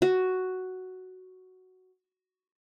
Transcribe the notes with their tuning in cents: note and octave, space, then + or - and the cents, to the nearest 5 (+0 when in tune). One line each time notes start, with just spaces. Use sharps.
F#4 +5